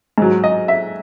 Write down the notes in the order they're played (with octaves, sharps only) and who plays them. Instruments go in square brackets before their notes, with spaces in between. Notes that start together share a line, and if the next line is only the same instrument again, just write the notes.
[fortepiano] G#2 F#3
D#5
E5